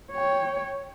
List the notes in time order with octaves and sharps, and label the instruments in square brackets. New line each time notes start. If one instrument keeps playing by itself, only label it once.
[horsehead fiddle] C#5 G5